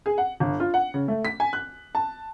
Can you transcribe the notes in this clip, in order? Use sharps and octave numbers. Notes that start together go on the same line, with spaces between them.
G#4
F#5
G1
F4
F#5
C#3
A3
B6
G#5
F#6
A5